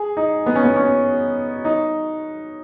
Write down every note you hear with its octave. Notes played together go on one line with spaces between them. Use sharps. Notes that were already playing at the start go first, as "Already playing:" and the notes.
Already playing: G#4
D#4
B3
C#4
B3
C#4
D#4